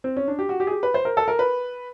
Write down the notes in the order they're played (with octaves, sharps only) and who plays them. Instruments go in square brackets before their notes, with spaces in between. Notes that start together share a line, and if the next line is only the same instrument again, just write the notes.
[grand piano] C4
C#4
D4
G4
F#4
G4
G#4
G4
B4
C5
A#4
A4
A#4
B4